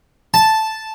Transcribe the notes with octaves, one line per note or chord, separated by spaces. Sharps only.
A5